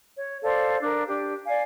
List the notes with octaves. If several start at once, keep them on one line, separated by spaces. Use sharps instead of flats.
C#5
A4 C5 D5 F5
D4 A#4
D4 G4
D5 F5 G#5